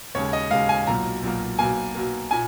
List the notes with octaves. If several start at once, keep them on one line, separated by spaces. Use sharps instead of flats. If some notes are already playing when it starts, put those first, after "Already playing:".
D#2 C#3 G#3 C#5
D#5
D#2 C#3 G#3 F5
G#5
B1 A#2 F#3 A#3 A#5
B1 A#2 F#3 A#3
B1 B2 A#3 G#5
B1 B2 A#3
A#2 G#5